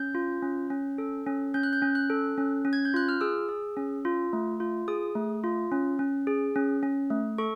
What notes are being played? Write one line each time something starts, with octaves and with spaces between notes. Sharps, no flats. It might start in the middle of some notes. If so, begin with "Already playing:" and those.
Already playing: C#4 G6
F4
C#4
C#4
A4
C#4
C#4 G6
F#6
G6
C#4
F#6
A4
C#4
C#4
G#6
G6
F4 F#6
F6
G#4 E6
G#4
C#4
F4
A3
F4
G#4 D#6
A3
F4
C#4
C#4
G#4
C#4
C#4
A3
A4 C#6